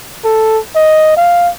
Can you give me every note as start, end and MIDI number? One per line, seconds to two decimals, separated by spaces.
0.24 0.59 69
0.75 1.12 75
1.17 1.50 77